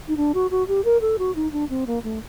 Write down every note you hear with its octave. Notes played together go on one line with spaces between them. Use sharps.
D#4
D4
F#4
F#4
G4
A#4
A4
F#4
D#4
D4
C4
A#3
A3